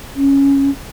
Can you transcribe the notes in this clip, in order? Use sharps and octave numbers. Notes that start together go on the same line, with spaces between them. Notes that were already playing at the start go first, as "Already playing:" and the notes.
C#4